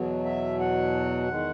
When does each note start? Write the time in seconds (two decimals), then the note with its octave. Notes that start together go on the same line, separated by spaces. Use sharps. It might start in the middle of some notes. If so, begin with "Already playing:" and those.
Already playing: E2 B2 F#3
0.25 E5
0.60 F#5
1.28 E2 D#3 G#3